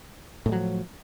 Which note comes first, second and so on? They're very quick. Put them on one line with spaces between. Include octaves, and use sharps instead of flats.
A2 G#3 F#3 F3